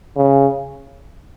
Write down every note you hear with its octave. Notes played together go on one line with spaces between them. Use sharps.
C#3